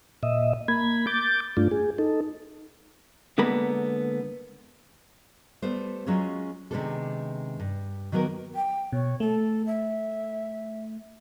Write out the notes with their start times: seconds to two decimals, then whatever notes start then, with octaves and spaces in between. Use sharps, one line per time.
0.23 A#2 D#5 E5
0.68 A#3 B5 G#6
1.07 D6 G6 A6
1.57 G2 A3 D4 F4
1.71 G#4
1.98 D#4 A4
3.38 D3 G#3 A#3 B3 A#4 B5
5.62 G3 A3 B3 C5
6.06 F#3 G#3 C#4 F4 F#4 G#4
6.71 C3 D#3 G#3 B3 D4 A4
7.60 G2
8.12 D#3 F#3 A#3 B3 A#4
8.55 G5
8.93 B2 C#5
9.20 A3 A4
9.66 E5